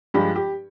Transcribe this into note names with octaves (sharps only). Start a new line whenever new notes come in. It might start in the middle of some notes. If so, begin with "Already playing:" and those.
G2 F3 G#3 G4
G4